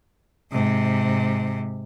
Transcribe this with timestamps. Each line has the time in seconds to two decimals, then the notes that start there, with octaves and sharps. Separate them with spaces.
0.52 G#2 C3